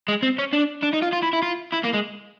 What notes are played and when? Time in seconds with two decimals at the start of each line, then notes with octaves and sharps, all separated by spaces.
0.08 G#3
0.23 C4
0.39 C#4
0.53 D4
0.83 D4
0.93 D#4
1.02 F4
1.13 F4
1.23 E4
1.33 E4
1.42 F4
1.72 E4
1.84 A#3
1.93 G#3